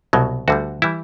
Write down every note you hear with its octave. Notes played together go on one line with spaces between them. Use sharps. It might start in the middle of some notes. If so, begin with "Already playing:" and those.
C2 B2 F#3
D2 D3 G3 F#4
E3 G3 E4